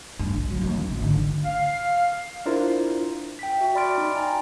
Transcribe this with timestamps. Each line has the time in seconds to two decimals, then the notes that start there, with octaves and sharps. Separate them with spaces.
0.19 G2
0.37 B1
0.51 F#3
0.62 D#2
0.75 C#4
0.90 G#1
1.02 D3
1.45 F5
2.46 D4 E4 F4 A#4 C5
3.39 G5 B6
3.58 F#4 E5
3.75 D5 B5 C6 F6 A6 D7
3.98 D#4
4.14 G5 G#5 A#5